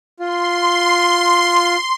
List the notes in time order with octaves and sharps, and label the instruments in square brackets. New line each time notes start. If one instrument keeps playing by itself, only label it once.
[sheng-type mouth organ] F4 [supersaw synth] C6